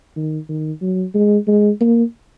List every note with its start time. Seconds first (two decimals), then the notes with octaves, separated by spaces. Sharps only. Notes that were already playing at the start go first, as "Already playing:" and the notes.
0.16 D#3
0.49 D#3
0.82 F#3
1.14 G#3
1.48 G#3
1.80 A#3